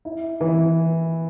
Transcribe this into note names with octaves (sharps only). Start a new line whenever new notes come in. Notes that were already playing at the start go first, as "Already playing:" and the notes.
E4
E3